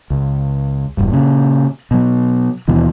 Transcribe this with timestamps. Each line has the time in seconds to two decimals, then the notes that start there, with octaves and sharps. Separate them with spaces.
0.10 C#2
0.97 E1 G2
1.10 A#2 C#3
1.91 B2 F#3
2.68 D#2 B2 E3